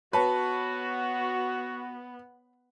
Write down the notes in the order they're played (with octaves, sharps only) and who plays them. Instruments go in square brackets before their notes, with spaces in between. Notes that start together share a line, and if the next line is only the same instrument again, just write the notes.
[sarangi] B3 [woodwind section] F#4 [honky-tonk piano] B4 [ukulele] C#5 A5